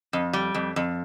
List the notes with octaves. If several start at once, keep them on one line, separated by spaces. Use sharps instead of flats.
F2
G3
F2
F2